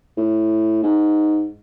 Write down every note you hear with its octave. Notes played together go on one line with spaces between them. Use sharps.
A2
G#2